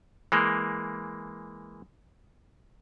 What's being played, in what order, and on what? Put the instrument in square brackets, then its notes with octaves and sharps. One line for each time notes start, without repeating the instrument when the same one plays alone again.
[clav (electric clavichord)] E3 G#3 A#3